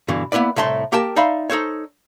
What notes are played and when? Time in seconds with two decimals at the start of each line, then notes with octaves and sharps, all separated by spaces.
0.08 G2 B2 D3 E3
0.32 A#3 B3 E4 B4 D5
0.56 C2 A2 A3 A5 C6
0.92 A#3 G4 A#4 G5 A5
1.16 D#4 D5 E5 F5 B5 C6
1.50 D#4 A4 C5 C#5